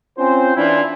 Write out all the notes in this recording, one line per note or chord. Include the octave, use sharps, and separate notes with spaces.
C4 C#4 F4 C5
E3 C#4 D4 E4 F4 C5